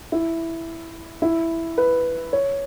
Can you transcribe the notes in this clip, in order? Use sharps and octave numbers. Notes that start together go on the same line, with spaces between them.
E4
E4
B4
C#5